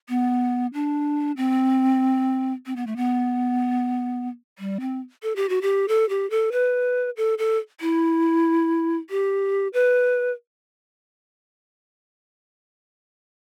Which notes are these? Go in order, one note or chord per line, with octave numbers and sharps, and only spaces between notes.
B3
D4
C4
C4
B3
A3
B3
G3
C4
A4
G4
F#4
G4
A4
G4
A4
B4
A4
A4
E4
G4
B4